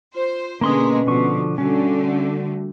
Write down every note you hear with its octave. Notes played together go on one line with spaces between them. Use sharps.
F4 C5
B2 D3 G#3 A#3 C#4 B4 C6 D#6
B2 D3 F3 C#6
D3 G3 A3 C#4 F#4